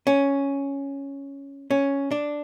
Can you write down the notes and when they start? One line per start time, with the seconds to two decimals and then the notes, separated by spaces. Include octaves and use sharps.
0.07 C#4
1.71 C#4
2.11 D4